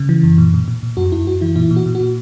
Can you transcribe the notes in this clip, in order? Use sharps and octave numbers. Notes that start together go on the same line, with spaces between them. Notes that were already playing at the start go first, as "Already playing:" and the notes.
Already playing: C#3
E3
F#2
A#2
A#2
A#2
A#2
F#2 F#4
F#2 E4
F#2 F#4
E3 E4
A#2 E4
A#2
F#4
A#2
F#4
A#2